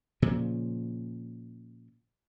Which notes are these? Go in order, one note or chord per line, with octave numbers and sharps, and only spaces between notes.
A#2 C#3 F3